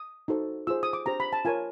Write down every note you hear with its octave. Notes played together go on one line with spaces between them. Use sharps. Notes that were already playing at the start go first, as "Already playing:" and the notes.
Already playing: D#6
D#4 F#4 A4 C5
F4 G#4 C5 E6
D#6
D6
D4 G4 C5 A#5
B5
A5
F4 A#4 C#5 G#5